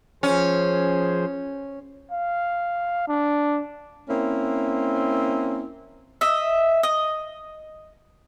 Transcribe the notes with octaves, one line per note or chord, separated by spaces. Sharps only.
F3 C#4 G#4 C5
F5
D4
A#3 C4 C#4 E4
D#5 E5
D#5